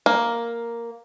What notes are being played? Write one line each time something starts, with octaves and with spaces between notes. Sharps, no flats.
A#3